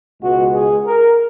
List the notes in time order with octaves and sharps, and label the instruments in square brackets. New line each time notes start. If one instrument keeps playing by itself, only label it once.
[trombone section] C#2 B2 G#3 F#4
G#4
A#4